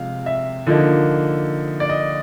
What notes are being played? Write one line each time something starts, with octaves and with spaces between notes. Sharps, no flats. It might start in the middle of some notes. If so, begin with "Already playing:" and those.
Already playing: C3 F3 G#3 F5
E5
D3 F3 A#3 D#4
D5
D#5